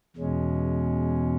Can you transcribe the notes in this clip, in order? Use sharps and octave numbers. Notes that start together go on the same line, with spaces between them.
E2 B2 G#3 C#4